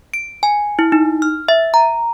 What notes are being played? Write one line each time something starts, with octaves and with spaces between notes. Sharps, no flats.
D7
G#5
E4
D#4
F6
E5
A#5